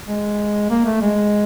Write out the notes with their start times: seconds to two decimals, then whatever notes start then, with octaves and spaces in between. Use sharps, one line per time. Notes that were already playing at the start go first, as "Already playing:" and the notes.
0.08 G#3
0.70 A#3
0.86 A3
1.02 G#3